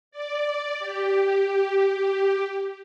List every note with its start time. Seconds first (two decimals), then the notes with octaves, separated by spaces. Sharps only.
0.11 D5
0.79 G4